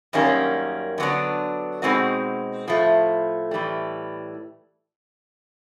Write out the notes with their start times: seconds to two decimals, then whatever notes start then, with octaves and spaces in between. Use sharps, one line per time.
0.13 F#2 D#3 G3 A#3 C#4
0.98 D3 F#3 B3 D4
1.82 B2 G#3 C4 D#4 F#4
2.67 A2 F3 A3
3.51 A2 E3 G3